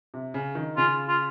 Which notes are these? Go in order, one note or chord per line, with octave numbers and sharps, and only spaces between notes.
C3
C#3
D#3
C#3 F4
F4